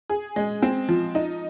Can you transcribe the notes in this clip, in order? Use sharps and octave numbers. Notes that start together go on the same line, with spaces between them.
G#4
G#3
C4
F3
D#4